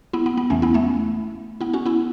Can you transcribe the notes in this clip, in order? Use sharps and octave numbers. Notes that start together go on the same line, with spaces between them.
B3 E4
B3
B3
E2 C#3 E3 A3 C#4
B3 E4
A3 C#4
B3 E4
C#4 F#4
B3 E4